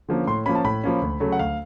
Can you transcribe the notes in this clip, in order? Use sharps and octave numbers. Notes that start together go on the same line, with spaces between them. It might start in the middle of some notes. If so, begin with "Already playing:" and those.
D3 F3 A#3 C#4
A2 C6
F3 A#3 C#4 B5
A5
A2 B5
F3 A#3 C#4
D2
C#3 F#3 A3
F#5
D2 F5